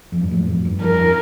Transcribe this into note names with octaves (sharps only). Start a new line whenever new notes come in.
F2
G2
F2 A2
F2
G2
F2 A#4